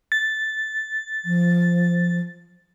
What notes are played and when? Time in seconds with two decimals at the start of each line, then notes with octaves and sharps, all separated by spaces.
0.12 A6
1.25 F3